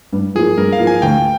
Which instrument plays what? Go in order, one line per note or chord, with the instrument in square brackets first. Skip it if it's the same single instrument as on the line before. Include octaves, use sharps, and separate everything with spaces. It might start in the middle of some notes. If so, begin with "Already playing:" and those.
[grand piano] G2
[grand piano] F3 A#3 [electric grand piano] G#4
[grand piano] G2 [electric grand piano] A#4
[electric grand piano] F5
[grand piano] F3 A#3
[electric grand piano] G#5
[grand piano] D2 [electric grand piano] G5